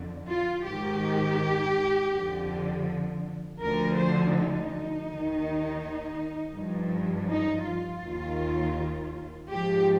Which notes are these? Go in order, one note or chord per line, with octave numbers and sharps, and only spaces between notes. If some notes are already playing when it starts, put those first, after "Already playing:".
Already playing: F2 D3
F4
G#2 D#3 G4
F2 D3 F3
D2 D3 F3 A#4
C5
D#4
D#2 D#3
G2 F3
D#4
F4
D#2 D#3
G#2 F3 G4